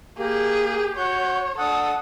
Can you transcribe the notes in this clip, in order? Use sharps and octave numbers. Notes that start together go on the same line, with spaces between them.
A#3 G4 G#4
F#4 C#5 F#5 G6
D4 A4 F#5 D#6